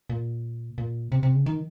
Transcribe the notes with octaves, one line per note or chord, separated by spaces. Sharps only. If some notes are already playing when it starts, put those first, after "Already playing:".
A#2
A#2
C3
C3
C#3
D#3